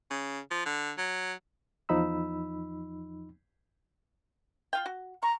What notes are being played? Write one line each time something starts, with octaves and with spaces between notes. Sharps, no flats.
C#3
F3
D3
F#3
E2 F3 D#4 B5 E6
F4 F5 G5
F#4
A#5 C#6